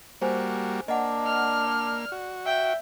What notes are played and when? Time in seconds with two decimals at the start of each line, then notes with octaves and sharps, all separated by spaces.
0.22 G3 A#3 F#4 C5 G#5
0.88 A#3 D4 D#5 F#5
1.26 F6
1.67 D5
2.12 F#4
2.46 E5 G5